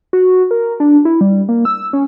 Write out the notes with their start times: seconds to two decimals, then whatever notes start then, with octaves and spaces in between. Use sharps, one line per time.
0.13 F#4
0.51 A#4
0.80 D4
1.05 E4
1.21 G3
1.49 A#3
1.65 E6
1.93 C#4